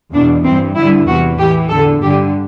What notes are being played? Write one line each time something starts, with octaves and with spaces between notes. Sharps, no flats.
E2 B2 D4
G2 E3 C4
G2 D3 E4
E2 C3 E3 F#4
A2 E3 G4
E2 D3 A4
G2 D3 G4